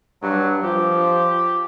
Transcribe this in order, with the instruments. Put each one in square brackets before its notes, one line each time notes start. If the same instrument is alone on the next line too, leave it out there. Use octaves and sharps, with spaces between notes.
[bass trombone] G2 [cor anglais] F#3
[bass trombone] F3 [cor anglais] G4